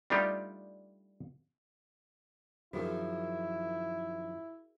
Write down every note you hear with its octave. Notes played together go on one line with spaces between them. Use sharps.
G3 A3 D4 D#4 F4 G4
F#2 D#3 F3 E4 F#4 G#4 A#4